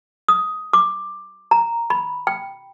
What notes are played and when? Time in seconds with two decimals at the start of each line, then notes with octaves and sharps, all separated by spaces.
0.28 D#6
0.73 D6
1.51 A#5
1.90 B5
2.27 G5